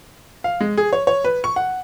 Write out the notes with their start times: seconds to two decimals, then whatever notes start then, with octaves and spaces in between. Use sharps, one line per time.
0.44 F5
0.61 G#3
0.78 G#4
0.93 C#5
1.07 C#5
1.24 B4
1.44 C#6
1.56 F#5